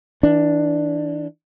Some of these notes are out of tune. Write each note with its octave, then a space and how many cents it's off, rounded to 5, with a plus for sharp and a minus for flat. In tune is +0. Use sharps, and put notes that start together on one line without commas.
E3 -30 D4 +0